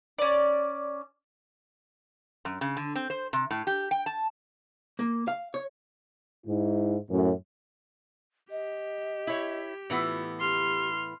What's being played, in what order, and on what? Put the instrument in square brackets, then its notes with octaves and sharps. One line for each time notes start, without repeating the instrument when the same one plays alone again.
[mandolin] C#4 D5
[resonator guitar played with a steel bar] F#2
C#3
D3
C4
C5
C3
A2
G4
G5
A5
[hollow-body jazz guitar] A#3
F5
C#5
[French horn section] G#2 E4
F#2 A2
[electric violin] G4 [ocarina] D#5
[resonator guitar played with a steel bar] E4 C#5
[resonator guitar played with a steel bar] A2 E3 B3 [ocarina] F4
[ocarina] G4 [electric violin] C6 F6